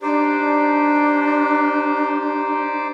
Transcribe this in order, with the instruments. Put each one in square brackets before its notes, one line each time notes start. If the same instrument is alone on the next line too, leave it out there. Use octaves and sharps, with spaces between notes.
[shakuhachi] D4 [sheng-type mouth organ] D#4 C5 D5 [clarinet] G4